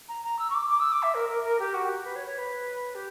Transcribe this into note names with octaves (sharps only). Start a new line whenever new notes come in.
A#5
A#5
E6
C#6
D6
D6
E6
D6
E5
A#4
A#4
A#4
G4
F#4
G4
B4
C#5
C#5
B4
G4